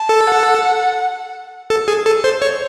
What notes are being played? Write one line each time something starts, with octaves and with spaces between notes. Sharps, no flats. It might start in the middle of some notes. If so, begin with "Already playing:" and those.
Already playing: A5
A4
F#5
A4
G#4
A4
C5
C#5